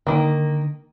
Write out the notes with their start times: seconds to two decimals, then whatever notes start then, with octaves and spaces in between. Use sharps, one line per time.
0.07 D3 D#3 A#3